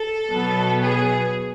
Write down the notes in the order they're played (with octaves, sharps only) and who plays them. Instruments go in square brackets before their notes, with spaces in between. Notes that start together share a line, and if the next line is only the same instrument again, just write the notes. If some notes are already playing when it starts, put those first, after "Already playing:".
Already playing: [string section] A4
B2 F#3 B3
G#4